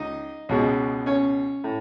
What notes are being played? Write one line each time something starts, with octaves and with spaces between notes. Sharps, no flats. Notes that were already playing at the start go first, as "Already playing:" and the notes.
Already playing: C#2 D#4 D#5
C#2 B2 G#3
C#4 C#5
A2